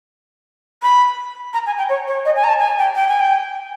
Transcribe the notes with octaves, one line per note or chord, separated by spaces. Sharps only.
B5
A#5
G#5
G5
C#5
C#5
D#5
G#5
A#5
A5
G#5
G5
G5
G#5
G5